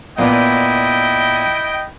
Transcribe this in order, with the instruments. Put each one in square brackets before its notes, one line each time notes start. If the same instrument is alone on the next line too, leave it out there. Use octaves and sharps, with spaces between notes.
[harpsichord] A#2 B3 D4 [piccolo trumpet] E4 [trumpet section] D#5 G5